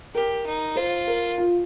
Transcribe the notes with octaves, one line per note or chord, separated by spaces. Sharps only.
G4 A#4
D#4
F4 C5
A#4
F4